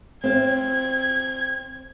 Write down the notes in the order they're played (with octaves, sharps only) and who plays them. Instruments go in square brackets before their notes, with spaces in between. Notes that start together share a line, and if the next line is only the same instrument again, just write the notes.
[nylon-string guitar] C4 F5 [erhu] G#6